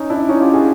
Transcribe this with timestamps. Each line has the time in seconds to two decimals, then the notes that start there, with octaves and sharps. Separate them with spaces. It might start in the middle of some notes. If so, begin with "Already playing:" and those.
Already playing: C#4 D#4
0.10 D4 E4
0.29 C#4 D#4
0.41 F4 G4
0.54 F#4 G#4